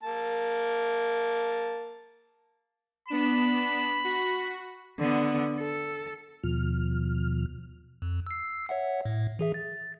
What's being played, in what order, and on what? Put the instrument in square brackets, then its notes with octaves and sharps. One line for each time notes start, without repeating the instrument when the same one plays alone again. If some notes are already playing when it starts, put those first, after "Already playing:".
[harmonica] A#3 A5
[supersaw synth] B3 D4 E7 [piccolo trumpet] B5
[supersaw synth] F#4
[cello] D3 B3
A4
[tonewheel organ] D#2 B2 F3 F6
[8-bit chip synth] F2
E6 C7
C#5 E5 F#5
A2
E3 G#4 E5
A6